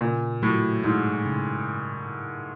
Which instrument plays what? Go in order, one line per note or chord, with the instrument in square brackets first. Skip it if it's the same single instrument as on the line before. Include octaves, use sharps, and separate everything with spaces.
[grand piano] A#2 [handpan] C#3
[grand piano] A2 [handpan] F#3
[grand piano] G#2 [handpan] E4
[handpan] C#3